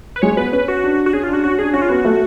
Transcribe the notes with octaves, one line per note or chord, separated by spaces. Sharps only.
B4
G#3 C#5
B3 B4
C#4 B4
F#4
D4
F#4
C#4 G#4
F4
D4 F#4
C#4 F#4
D4 G#4
C#4 F#4
F4
B3 F#4
A3